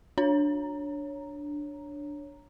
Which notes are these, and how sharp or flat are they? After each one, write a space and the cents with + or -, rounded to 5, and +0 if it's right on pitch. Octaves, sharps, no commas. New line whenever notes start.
D4 +0 C#5 +0 A#5 +0